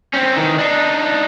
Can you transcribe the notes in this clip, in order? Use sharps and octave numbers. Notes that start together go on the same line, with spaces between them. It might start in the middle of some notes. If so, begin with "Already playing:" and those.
C4 C#4
D#3 E3
D4 D#4